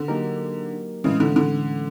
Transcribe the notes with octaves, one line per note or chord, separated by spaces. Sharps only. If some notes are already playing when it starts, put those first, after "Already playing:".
Already playing: D3
F#3 A#3 D#4 G4 A#4
A2 C#3 E3 G#3 C#4
D3
D3